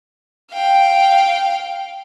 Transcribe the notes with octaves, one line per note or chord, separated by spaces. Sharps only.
F5 G5